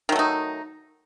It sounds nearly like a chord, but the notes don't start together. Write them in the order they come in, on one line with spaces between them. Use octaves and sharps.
D#3 F#3 A3 D#4